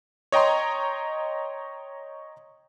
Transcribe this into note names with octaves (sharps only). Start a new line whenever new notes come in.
C#5 D#5 G5 A#5 C6